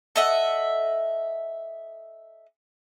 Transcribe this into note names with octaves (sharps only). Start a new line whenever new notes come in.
A4 D#5 E5 F#5